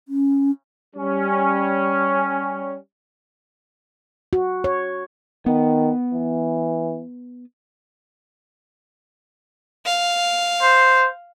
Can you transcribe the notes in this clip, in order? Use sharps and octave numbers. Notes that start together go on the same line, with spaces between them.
C#4
G3 C#4
F#4
C#5
D#3 B3
E3
F5
C5